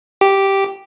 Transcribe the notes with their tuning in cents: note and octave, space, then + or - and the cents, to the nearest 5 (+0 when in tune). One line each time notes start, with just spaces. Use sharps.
G4 -5